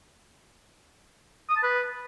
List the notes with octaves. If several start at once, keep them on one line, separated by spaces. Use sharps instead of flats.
D#6
A5
B4